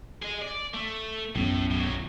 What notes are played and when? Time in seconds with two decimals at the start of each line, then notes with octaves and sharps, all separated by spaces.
0.22 G#4 D#5
0.42 D5
0.74 A3
1.36 B1 F#2 A2
1.71 A2 F#3